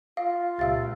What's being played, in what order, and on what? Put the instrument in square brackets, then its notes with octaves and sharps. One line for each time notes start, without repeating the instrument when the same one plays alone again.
[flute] F4 [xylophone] F5
[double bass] C#2 A#2 [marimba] G4 E5 E6 [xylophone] F5 A6